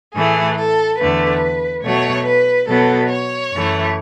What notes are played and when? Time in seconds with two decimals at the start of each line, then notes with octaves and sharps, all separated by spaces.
0.15 A2 E3 A3 G#4
0.57 A4
1.00 E2 D3 A3 B4
1.84 B2 F#3 A3 C#5
2.26 B4
2.68 B2 F#3 B3 A4
3.10 C#5
3.53 F#2 E3 A3